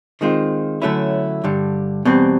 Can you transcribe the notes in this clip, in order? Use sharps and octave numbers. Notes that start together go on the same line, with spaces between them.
D#3 G#3 C4 F4
D3 F#3 A3 C#4 E4
G2 D3 G3
E2 B2 G3 C4